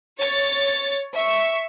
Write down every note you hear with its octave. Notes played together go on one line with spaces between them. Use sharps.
C#5 A6
E5 C#6